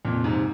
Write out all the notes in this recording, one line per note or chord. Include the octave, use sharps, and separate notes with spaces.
F2 A#2
G#2 C3